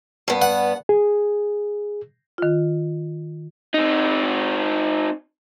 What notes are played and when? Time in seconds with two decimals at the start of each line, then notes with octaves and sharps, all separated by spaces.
0.28 G2 B3
0.42 F#5
0.89 G#4
2.38 D#3 F4
3.74 C4 D#4